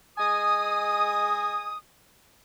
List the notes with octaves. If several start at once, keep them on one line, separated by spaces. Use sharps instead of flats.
G#3 D#5 G#5 D#6